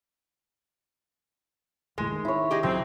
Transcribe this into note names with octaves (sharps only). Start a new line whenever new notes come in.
F1 D2 A2 G#3
D#3
E4 C#5
G4 G#4 D#5
B1 F2 C#3 F#3 C4